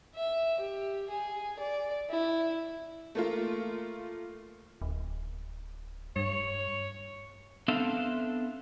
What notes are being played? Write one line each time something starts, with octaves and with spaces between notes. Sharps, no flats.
E5
G4
G#4
D5
E4
A3 A#3 F4
D1
G2 C#5
B3 C4 D4 A4 E5 F5